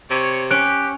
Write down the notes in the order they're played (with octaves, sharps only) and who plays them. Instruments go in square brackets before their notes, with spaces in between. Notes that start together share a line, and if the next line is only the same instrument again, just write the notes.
[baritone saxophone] C3 [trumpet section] C#5
[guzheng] C#4 [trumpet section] G4 [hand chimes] F#6 D7